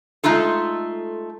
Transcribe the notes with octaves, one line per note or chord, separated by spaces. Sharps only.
G#3 A3 D#4 F4 A4